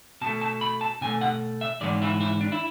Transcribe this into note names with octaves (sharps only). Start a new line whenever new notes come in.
B2 A3 A5
A5
B5
A5
B2 A3 G#5
F#5
E5
G#2 E3 G#3 B3 D5
E4
E4
D4
E4